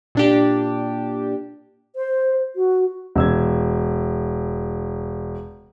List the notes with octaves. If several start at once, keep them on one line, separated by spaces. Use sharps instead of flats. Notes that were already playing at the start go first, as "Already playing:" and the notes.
A#2 D4 G4
C5
F#4
E1 E6 G#6